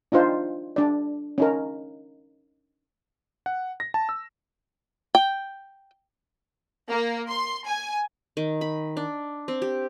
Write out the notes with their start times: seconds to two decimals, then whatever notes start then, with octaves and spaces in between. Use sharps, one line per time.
0.12 D4 D#4 F4 C5
0.76 D4 D5
1.38 C#4 D#4 A#4
3.46 F#5
3.80 A#6
3.94 A5
4.09 E6
5.15 G5
6.90 A#3
7.31 C6
7.66 G#5
8.37 D#3
8.61 B5
8.97 D4
9.48 C4
9.62 G4